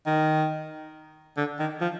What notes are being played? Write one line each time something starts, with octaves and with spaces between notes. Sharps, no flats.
D#3
D3
D#3
F3